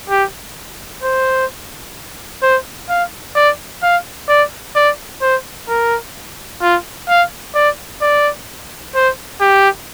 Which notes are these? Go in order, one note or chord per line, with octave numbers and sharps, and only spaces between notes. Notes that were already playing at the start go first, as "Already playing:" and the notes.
G4
C5
C5
F5
D5
F5
D5
D5
C5
A#4
F4
F5
D5
D5
C5
G4